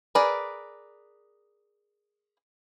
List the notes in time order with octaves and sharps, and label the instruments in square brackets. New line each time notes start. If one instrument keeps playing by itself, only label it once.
[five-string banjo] G#4 A#4 B4 D5